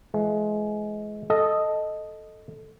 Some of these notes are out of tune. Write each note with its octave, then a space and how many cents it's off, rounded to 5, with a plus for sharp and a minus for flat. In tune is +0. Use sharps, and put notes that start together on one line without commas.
E3 +35 G#3 +25
A4 +0 D#5 +0